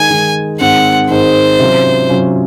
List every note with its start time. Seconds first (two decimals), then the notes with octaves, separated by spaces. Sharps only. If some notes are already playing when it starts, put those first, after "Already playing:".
Already playing: D#3 G#3 D#4 G#5
0.10 D#3 G#3 D#4
0.60 G#2 D#3 G#3 C4 D#4 F#5
1.10 G#2 D#3 G#3 C4 D#4 C5
1.60 C3 F#3 C#4 F4
2.09 C3 F#3 C#4 F4